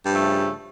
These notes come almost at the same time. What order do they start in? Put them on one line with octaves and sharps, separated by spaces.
G2 F3 A3 C#3